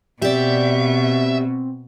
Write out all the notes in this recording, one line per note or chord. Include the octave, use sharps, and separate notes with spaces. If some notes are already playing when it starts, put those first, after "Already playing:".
B2 C4 G4 D5 E5